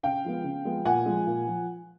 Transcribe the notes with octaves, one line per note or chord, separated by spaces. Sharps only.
C#3 F5 G5
F3 G#3 B3
C#3
F3 G#3 B3
A#2 F#5 G#5
F3 G#3
A#2
F3